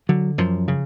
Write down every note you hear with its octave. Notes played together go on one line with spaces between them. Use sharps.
D3 F#3
F#2 F3
C#3